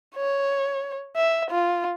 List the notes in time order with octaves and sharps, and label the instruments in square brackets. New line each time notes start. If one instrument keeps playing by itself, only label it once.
[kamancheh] C#5
E5
F4